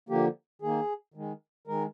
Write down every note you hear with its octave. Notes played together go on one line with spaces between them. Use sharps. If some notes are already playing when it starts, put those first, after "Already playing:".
D3 F3 A#3 G4
D#3 A#3 G#4
D#3 G#3
D#3 G#3 A#4